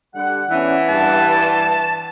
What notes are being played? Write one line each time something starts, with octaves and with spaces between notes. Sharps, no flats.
D3 G3 F#5
E3 B3 C#4 D4
G2 A5